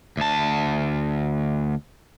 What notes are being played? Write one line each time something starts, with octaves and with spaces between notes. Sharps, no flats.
D2 A5